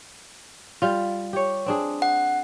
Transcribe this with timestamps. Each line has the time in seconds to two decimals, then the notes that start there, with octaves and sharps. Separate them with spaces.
0.82 G3 F4
1.33 G4 C#5
1.66 C4 D4 G#4
2.02 F#5